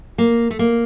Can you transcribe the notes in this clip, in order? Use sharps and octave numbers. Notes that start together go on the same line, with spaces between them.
A#3
A3
A#3